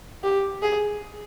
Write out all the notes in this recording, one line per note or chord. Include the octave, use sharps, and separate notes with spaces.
G4
G#4